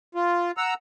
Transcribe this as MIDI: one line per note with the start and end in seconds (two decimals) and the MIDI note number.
0.15 0.51 65
0.57 0.74 78
0.57 0.74 82
0.57 0.74 88